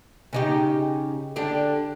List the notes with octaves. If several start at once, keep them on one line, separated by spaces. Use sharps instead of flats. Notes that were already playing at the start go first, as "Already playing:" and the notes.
C#3 D#4 G4
D3 D4 G4